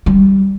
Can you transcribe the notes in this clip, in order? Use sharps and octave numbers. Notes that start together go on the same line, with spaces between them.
G3